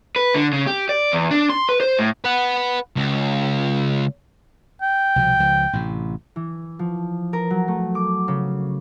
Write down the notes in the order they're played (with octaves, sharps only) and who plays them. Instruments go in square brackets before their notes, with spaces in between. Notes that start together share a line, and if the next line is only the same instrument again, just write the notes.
[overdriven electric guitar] B4
D3
C#3
G4
D5
E2
D4
C6
B4
C5
A2
[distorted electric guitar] B4 F#5
C#2
[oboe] G5
[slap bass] C2 B2 F3
C#2 F3
A1 A2 C3
[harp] E3
F3
A#4
F#3
A3
D6
C#3